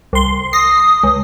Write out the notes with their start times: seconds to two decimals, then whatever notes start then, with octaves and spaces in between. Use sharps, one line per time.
0.13 C2 C6
0.53 D#6 A#6 C7
1.03 C#2